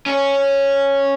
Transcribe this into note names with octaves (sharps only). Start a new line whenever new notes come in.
C#4 C#5